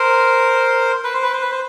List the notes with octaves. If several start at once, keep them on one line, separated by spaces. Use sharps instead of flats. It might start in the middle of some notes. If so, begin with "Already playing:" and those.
Already playing: A#4 C5
B4
C5
B4
C5
B4
C5